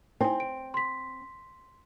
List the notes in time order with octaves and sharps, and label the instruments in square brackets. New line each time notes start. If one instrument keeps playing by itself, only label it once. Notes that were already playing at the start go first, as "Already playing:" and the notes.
[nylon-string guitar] C4 [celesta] D#4 E4 G#5
[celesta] D7
C6 B6